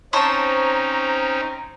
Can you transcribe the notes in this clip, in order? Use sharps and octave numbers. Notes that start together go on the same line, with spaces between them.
C4 C#4 D#4 C5 C#5 A5 A#5